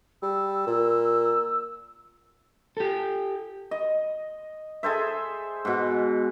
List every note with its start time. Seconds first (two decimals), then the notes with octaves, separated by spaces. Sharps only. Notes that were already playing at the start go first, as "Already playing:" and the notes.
0.23 G3 E6
0.67 A#2
2.77 G4 A4
3.71 D#5
4.83 G#4 A4 C5 E5
5.65 G#2 B2